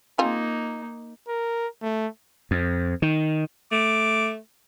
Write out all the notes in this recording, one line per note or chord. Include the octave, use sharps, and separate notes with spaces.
A#3 C4 D#4 F4 G#4
A#4
A3
F2
D#3
A3 D6